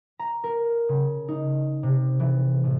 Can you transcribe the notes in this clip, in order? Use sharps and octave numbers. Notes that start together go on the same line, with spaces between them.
A#5
A#4
C#3
D#4
C3
E3
A1